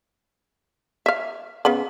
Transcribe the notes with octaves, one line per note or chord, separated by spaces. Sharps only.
E5 F5
C#3 B3 B5